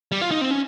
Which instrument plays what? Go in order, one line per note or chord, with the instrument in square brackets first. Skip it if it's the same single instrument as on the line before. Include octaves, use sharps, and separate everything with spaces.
[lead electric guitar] G3
F4
D#4
C4
C#4